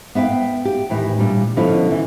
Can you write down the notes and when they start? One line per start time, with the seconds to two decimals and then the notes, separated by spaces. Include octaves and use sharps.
0.15 B3 E5 F5 G5
0.65 G4
0.90 D#2 A2 E3
1.18 A#2 G3 D4
1.57 B2 D3 F3 C#4 E4 F4
1.91 E3